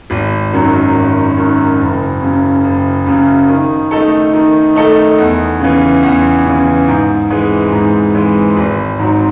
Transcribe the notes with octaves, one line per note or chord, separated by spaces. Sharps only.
G#1
F#2 D#3 F#3
G#1
F#2 D#3 F#3
F#1
F#2 C#3
F#1
F#2 C#3
D#3
A3 D#4 A4
D#3
A3 D#4 A4
E2
C#3 E3
E2
C#3 E3
G#2
E3 G#3 C4
G#2
E3 G#3 C4
G#1
G#2 F#3 C4